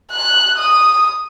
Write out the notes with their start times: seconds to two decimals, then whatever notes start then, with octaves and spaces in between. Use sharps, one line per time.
0.12 F#6
0.59 D#6